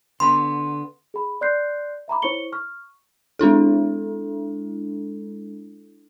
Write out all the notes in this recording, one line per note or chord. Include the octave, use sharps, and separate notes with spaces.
D3 B3 B5 C6
G#4 B5
D5 C6 F#6 G6 C7
E5 A#5 B5 D6
E4 C5 C#5 C#6 C#7 G7
C#6 F6
G#3 D4 E4 A4